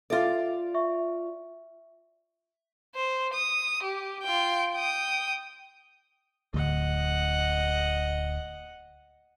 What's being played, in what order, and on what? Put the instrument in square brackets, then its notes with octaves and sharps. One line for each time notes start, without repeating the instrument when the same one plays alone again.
[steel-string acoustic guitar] F4 D5 [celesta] A4 E5 A6
[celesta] E5 C#6
[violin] C5
D#6
G4
F4 G5
G5 D#6
[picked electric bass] D1 G1 D2 [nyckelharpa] D#5 F#5